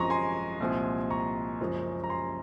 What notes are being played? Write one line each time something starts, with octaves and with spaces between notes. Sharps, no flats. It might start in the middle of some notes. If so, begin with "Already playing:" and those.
Already playing: G#1 F#2 F3 G#3 G#5 A#5 C6 C#6
G#5 C6
C2 A#2 F3 G#3
A#5 C#6
F#1 F#2 F3 G#3
A#5
G#5 C6